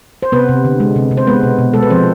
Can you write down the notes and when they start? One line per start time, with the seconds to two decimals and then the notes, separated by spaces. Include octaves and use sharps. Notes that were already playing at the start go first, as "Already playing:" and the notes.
0.23 C5
0.32 C3 B3 B4
0.49 C3
0.65 D3
0.80 G#3
0.96 C3
1.11 C3
1.17 C5
1.27 G#3 B3 B4
1.43 B2
1.58 B2
1.73 G#3 A4
1.83 B4
1.90 F3 C4 C5